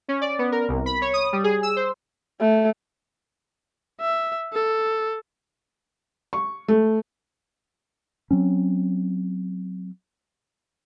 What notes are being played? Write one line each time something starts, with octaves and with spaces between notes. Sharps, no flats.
C#4
D5
B3
A#4
C2
B5
C#5
D#6
G3
G#4
E6
C5
A3
E5
A4
C#6
A3
F#3 C4 C#4